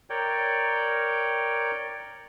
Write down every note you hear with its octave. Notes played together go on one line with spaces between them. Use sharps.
A#4 C#5 D5 G5